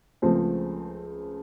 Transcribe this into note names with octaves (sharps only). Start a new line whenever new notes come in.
C#2 C#3 F3 A3 C4